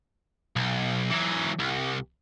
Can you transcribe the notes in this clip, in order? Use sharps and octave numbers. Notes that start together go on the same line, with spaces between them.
B1
E3 F#3
C2